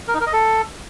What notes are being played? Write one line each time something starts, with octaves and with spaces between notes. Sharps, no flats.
A#4
D#4
A#4
D#5
A4